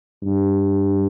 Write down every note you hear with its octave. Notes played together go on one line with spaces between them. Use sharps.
G2